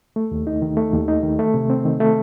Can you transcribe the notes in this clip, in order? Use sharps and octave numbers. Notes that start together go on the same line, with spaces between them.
A3
D#2
D#4
D#3
A3
D#2
D#4
D#3
A3
C3
C4
D#3
A3